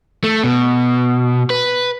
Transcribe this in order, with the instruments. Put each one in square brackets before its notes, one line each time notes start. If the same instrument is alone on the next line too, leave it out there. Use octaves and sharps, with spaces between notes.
[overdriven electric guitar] A3
B2
B4